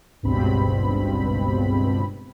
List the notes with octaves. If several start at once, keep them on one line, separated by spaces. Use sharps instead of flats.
G#1 C#2 G2 B2 C4 B5